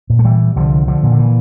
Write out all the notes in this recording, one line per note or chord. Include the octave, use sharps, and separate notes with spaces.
A#2
A3
E3 G3
C2 D3 F3
D3 F3
A#2
D3
E3